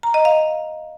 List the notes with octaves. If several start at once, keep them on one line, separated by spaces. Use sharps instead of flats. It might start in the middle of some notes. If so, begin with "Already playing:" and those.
A#5
D#5
F5